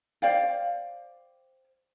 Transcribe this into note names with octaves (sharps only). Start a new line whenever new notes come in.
C5 D5 F5 G5